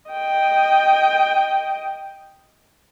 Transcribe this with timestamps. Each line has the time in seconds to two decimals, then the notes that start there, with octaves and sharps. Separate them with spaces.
0.11 D#5 G5